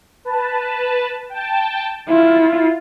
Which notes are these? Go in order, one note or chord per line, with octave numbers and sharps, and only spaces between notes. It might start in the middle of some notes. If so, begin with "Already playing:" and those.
B4 A5
G5 A5
E4 F4